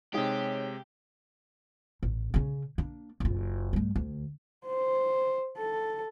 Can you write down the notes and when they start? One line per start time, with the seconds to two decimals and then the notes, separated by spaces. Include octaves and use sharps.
0.14 C3 G#3 D#4 G4 G#4 C#5 G5
2.03 A1
2.34 C#3 C#4
2.78 A#3 D4
3.20 F#1 F4
3.73 G2 A3
3.96 D2
4.66 C5
5.58 A4